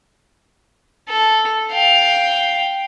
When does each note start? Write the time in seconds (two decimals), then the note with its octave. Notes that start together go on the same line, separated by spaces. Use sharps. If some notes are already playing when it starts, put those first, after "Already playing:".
1.09 A4
1.71 F5 G5